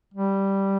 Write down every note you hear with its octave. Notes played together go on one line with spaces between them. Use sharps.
G3